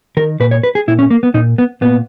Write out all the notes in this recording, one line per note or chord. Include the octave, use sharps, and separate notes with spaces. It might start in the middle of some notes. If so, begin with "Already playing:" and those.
D#3 A#4
A#2 B4
C#5
B4
G#4
A#2 E4
C#4
A#3
B3
A#2 D#4
B3
A#2 B3